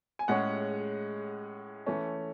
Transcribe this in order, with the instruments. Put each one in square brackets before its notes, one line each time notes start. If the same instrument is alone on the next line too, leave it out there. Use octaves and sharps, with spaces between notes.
[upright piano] G#5
A2 G#3 C#4 F#5
E3 A3 C#4